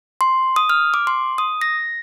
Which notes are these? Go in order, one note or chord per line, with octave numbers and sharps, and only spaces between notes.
C6
D#6
F6
D6
C6
D#6
A#6